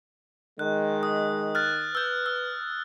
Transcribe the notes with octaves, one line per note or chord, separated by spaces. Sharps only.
D#3 G#3 F#6
D#6
F6 F#6 A6
B4 E6 G6
E6